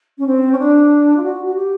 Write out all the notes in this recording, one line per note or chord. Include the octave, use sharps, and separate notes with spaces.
C#4
C4
C#4
D4
F4
F#4
F#4
G4